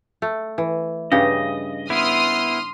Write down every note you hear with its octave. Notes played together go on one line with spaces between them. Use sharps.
A3
E3
G2 C#3 G4 D#5
B3 E4 C6 D#6 F6